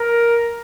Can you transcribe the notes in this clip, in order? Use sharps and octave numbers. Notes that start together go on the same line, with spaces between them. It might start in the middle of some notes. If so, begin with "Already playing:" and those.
Already playing: A#4